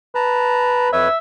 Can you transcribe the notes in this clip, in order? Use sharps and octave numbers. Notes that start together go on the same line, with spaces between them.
B4 A5 A#5
F2 B4 C#5 E5